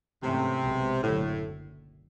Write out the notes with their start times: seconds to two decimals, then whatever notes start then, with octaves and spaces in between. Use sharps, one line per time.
0.23 G#2 C3 E3 A3 C#4
0.62 B1 B2 G#3 B3
1.03 F#1 F#2 A2 D3 F#3